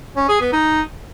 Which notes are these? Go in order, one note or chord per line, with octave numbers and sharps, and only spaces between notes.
C#4
G#4
B3
D#4